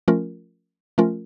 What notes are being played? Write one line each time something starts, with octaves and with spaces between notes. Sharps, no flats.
F3 A3 C#4 F4 A#4
F3 A3 C#4 F4 A#4